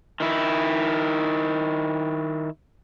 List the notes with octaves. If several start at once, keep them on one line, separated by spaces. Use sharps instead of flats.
D#3 E4